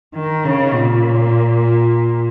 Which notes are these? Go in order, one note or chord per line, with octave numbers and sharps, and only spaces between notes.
D#3
C#3
A#2